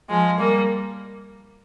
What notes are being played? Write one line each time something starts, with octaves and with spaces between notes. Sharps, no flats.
F3 G#3
G3 A#3